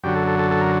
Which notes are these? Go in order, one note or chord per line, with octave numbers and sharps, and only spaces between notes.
F#2 D3 F#3 G4
A4
A4
A4
A4
A#4